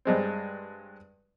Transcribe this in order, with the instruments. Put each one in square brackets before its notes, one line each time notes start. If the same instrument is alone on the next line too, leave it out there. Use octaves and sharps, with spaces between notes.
[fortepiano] G2 G#3 C4